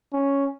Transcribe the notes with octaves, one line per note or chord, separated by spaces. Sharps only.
C#4